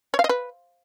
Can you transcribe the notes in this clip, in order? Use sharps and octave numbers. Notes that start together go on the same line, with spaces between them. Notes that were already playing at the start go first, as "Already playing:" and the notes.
C#5
F5
D#5
B4